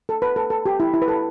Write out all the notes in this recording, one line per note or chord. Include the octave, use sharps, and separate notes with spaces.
A4
B4
A4
A4
G4
E4
E4
B4
A4